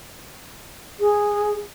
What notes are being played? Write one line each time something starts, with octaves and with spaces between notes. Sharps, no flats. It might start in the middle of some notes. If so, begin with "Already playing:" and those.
G#4